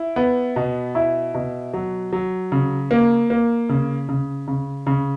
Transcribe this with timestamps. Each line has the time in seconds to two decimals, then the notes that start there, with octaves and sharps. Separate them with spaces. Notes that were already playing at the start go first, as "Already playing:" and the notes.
Already playing: E4
0.16 B3
0.56 B2
0.95 E4
1.34 B2
1.74 F#3
2.13 F#3
2.52 C#3
2.91 A#3
3.30 A#3
3.69 C#3
4.09 C#3
4.47 C#3
4.87 C#3